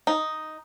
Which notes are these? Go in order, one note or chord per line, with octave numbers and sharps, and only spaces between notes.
D#4